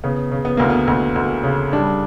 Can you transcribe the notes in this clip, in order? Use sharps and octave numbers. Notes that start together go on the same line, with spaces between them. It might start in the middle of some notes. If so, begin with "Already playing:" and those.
C#3 B3
C#3
B3
D2 A#3
B3
D2
D2
C#3
G3 D4